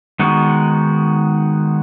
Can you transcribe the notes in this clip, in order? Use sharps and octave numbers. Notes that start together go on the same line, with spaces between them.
D#3 G#3 B3 D#4 F#4